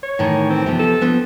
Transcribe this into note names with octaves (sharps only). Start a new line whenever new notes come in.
C#5
A2 D#3 E3
C4
C3 F3 B3
A4
F3 B3 D4